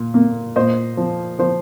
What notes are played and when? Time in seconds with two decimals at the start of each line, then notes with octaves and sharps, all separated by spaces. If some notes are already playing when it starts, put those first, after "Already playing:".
Already playing: A#2
0.14 A#3
0.56 A#2 C5 D#5
0.97 F3
1.39 F3 C5